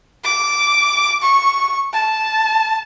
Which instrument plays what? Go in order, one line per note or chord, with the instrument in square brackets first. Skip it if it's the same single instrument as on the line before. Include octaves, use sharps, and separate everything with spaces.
[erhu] D6
C#6
A5